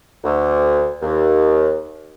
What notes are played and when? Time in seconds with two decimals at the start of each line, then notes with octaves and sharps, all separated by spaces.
0.24 D2
1.02 D#2